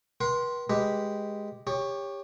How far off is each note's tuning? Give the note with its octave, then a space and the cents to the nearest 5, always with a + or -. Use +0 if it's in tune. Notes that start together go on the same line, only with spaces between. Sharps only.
B4 -40 G5 -45 C6 +0
G#3 +0 G4 +0 B4 -5
G4 +25 C#5 +0